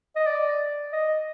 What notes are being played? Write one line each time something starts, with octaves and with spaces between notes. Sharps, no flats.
D#5
D5
D#5